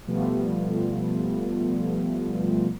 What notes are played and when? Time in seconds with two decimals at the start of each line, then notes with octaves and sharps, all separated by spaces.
0.07 B2 F3 G3 A3 B3 F4